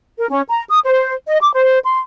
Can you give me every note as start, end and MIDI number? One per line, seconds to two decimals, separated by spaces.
0.17 0.28 70
0.29 0.41 61
0.49 0.62 82
0.69 0.79 87
0.84 1.12 72
1.27 1.38 75
1.41 1.49 86
1.53 1.78 72
1.84 1.98 84